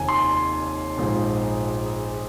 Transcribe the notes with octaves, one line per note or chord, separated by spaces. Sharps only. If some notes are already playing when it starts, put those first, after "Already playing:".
Already playing: F1 D#2 D#3 G#5
C6
A#1 G#2 F3 G#3